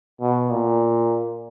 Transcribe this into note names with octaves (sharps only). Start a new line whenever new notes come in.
B2
A#2